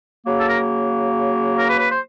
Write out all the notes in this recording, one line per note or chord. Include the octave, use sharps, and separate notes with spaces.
C#3 F#3 A#3
A4
A#4
A#4
B4
B4
C5